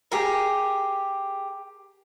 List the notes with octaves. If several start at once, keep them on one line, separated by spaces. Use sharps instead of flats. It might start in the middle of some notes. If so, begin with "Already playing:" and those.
G4 G#4 A#4